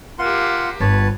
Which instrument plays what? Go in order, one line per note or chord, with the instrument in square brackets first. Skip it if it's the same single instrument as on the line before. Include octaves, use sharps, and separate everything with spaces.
[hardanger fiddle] A#3 G4 [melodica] F4 F#5 C6
[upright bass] G1 [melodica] B4 C#5 A5